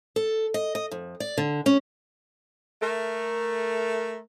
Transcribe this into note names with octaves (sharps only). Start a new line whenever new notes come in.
A4
D#5
D#5
F2
D5
D3
C#4
A3 A#4